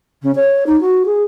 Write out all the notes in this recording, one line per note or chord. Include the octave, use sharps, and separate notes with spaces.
C#3
C#5
D#4
F#4
G#4